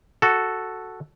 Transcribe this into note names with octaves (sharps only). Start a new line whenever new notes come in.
F#4 A4